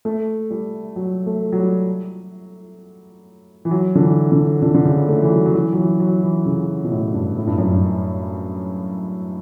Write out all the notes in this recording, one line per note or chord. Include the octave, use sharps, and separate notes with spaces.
A3
G3
F#3
A3
F#3
G3
E3
F#3
D3
E3
D3
D3
D3
C#3
A3
E3
F#3
F#3
E3
F#3
E3
F#3
E3
C#3
B2
A2
G2
A2
G2
F#2
G2